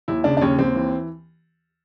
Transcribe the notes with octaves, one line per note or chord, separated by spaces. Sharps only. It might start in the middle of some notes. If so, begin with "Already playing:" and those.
D#2 E4
C#3 D4
D4
D#2 C#4
D#2 C4
E3